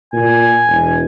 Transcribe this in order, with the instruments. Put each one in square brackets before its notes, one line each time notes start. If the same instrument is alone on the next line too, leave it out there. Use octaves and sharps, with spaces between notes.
[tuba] A#2 [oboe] G#5
[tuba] E1